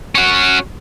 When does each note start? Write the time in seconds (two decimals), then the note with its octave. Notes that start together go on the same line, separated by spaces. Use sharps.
0.15 C#4 F#4